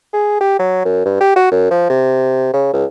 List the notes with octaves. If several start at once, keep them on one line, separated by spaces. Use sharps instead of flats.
G#4
G4
F#3
F#2
G2
G4
F#4
F#2
F3
C3
C#3
C#2